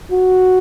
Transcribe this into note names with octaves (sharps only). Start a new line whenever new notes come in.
F#4